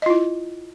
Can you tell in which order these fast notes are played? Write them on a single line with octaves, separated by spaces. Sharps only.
D#5 F4 E4